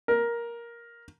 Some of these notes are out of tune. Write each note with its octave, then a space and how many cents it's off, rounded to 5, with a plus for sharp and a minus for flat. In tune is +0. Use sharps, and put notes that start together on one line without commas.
A#4 +10